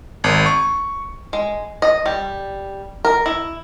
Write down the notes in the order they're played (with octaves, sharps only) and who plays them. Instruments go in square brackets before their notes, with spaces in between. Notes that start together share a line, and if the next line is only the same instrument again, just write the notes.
[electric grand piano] G#1
C#6
[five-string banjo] G#3
D#5
G3
A#4
E4